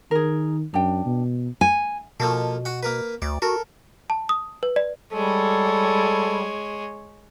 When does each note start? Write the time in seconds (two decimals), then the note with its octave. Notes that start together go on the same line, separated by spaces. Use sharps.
0.11 D#3 G#4 A#4
0.74 F#2 D4 G5
1.05 B2
1.61 G#5
2.20 B2 F3 A#3 A4
2.65 F#4 F#5
2.83 A#3 A#4 B4
3.22 D2 D5
3.42 F#4 A4 A#4
4.10 A5
4.29 D#6
4.63 B4
4.76 D5
5.13 G3 G#3 A4 C#5